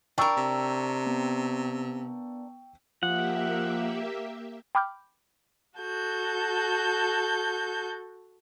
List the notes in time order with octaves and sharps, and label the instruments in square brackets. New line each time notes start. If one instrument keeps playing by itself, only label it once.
[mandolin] D4 A#4 [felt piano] G5 C#6 E6
[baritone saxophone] C3
[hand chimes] B3
[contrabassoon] F3 [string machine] A#3 G4 E5 [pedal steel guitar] F#5
[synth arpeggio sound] G5 B5 D6 F6 G6
[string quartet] F#4 A4 G6